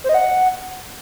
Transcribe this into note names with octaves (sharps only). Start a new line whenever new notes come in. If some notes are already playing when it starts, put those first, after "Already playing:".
C5
D#5
F#5